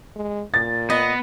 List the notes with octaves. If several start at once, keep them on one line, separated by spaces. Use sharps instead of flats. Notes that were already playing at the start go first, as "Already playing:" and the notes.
G#3
A#2 A6
B3 D#5